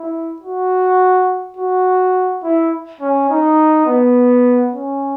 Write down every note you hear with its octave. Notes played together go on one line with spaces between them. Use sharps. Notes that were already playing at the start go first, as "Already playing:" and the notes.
Already playing: E4
F#4
F#4
E4
C#4
D#4
B3
C#4